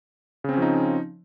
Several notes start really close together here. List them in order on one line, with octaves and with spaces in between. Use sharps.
C#3 C4 C#4 F3 D#4